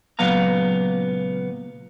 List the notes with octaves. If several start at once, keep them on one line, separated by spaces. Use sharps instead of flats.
C#2 A#2 F#3 B3 F5 A#5